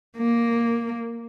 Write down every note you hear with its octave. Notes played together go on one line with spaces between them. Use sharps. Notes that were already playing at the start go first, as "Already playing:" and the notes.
A#3